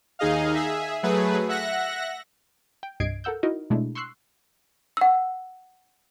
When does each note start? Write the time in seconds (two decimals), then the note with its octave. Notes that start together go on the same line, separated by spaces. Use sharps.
0.19 D#2 D#4 G#4 D#5 F5
0.55 G#4 E5
1.03 F#3 A3 G#4 B4
1.49 E5 F#5 F#6 A#6
2.83 G5
3.00 C2 G2 D#5 G#6 C7 D7
3.24 A4 A#4 F#5 E6 G6
3.43 D#4 E4 F#4 A#4 D#5
3.70 B2 G#3 A3 D4 E4
3.95 C6 C#6 E6 F#6 C7
4.97 F#5 E6